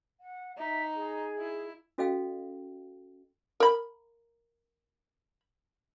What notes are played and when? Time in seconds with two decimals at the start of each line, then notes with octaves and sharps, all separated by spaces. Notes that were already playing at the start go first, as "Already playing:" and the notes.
0.20 F#5
0.58 D#4 E5
0.95 G#4
1.38 E4
1.98 C#4 F#4 A4 D#5 F5 G5
3.60 A#4 B5